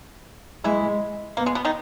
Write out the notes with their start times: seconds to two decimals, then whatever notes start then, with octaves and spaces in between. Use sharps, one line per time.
0.64 E3 G#3 E4
1.37 A#3 B3
1.46 G#3
1.55 B2 B3
1.65 D#3 D#4